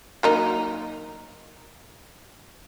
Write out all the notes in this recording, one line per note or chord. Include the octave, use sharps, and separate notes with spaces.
F#3 A#3 D#4